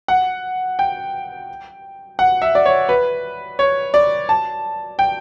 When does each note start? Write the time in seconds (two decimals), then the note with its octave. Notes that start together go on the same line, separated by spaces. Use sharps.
0.08 F#5
0.79 G5
2.19 F#5
2.42 E5
2.55 D5
2.66 C#5
2.89 B4
3.59 C#5
3.94 D5
4.29 A5
4.99 G5